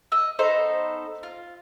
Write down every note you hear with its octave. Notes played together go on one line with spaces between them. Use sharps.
D#5 E6
B3 D#4 A4 C5
F4